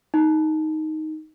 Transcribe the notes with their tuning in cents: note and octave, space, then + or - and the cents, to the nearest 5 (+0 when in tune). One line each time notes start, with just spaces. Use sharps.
D#4 +5